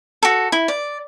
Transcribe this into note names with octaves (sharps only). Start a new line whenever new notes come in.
F#4 A4
E4
D5